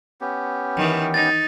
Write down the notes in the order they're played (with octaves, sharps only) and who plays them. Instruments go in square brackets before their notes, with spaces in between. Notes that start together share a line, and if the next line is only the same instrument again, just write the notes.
[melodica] B3 C#4 G4
[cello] D#3 E3
[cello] D#4 [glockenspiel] A6 A#6